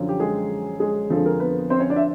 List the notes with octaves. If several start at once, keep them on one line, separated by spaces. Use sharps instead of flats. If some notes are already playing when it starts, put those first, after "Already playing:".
Already playing: F#2 D3 F3
G4
G#3 G#4
G#3 G#4
F2 D3 F3 A4
A#4
B3 B4
C4 C5
C#4 C#5
D4 D5
E5